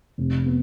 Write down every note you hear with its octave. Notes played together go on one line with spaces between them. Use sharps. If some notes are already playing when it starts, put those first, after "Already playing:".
F1
B3